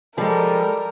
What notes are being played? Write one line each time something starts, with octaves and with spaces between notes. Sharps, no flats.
F3 G3 G#3 A4 A#4